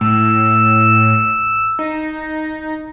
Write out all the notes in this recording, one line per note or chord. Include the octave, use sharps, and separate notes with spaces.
A2 E6
D#4